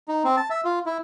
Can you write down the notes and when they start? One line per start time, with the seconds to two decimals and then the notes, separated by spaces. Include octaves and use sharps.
0.08 D#4
0.25 C4
0.37 A5
0.50 E5
0.65 F4
0.86 E4